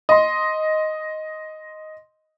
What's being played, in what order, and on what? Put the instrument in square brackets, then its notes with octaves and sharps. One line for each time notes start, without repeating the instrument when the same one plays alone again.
[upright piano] D#5 C6